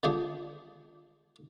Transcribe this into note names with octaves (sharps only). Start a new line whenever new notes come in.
D3 F3 G#3 G4 G#4